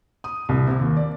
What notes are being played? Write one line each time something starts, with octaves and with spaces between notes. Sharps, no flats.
D#6
C2
C3
D#2
D5